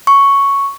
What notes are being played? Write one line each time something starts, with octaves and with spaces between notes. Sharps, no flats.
C#6